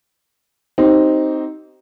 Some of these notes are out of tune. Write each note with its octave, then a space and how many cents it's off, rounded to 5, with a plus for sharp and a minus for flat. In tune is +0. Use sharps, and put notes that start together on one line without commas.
C4 +0 D#4 +0 G4 -35